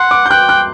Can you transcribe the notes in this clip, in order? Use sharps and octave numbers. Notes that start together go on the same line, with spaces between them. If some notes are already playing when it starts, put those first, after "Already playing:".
Already playing: F#5 C6
D6
G6
G5 F#6
F#6